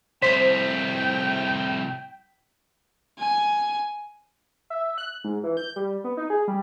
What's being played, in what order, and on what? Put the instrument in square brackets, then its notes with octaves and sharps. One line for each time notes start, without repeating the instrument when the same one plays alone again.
[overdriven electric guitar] C2 A2 [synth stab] C5 [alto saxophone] G5 [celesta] B6
[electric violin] G#5
[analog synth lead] E5
F#6
G#2
E3
G6
G3
B3
D#4
G#4
G3